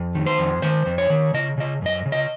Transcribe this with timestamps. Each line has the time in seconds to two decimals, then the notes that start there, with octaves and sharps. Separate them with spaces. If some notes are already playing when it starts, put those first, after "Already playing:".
Already playing: F2
0.15 D#3
0.26 C5
0.38 F2
0.62 D#3 C5
0.86 F2
0.98 C#5
1.10 D#3
1.34 C#3 D#5
1.58 C#3 D#5
1.82 F#2 D#5
2.06 C#3
2.12 D#5